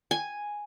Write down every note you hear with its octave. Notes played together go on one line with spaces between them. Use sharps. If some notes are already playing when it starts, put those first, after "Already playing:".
G#5